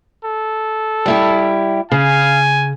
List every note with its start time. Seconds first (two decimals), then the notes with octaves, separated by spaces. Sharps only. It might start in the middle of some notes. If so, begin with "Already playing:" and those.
0.24 A4
1.06 G3 E4 G4
1.92 C#3 F5 G#5